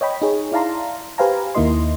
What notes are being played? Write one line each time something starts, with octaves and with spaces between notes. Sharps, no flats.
C#5 D#5 G5 B5
D#4 G#4 C#5
E4 D5 F5 A5 A#5 C6
G4 B4 C5 F5 G#5 A#5
D#2 D#3 A#3 E4 D#5 C6